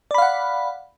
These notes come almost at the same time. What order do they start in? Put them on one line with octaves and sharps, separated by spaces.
D5 B5 F5 F#5